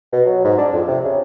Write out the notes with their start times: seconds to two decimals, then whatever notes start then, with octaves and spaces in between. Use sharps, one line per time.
0.12 B2
0.26 F#3
0.44 G#2
0.58 D4
0.73 F2
0.88 C3
1.04 C#3